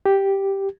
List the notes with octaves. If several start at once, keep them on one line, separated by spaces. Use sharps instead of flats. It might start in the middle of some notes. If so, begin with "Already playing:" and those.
G4